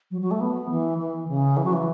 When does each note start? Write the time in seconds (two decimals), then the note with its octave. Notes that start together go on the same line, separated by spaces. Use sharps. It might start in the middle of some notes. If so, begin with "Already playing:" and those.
0.11 F#3
0.21 F#3
0.31 A3
0.41 B3
0.70 E3
0.98 E3
1.28 C#3
1.57 E3
1.64 F#3
1.73 E3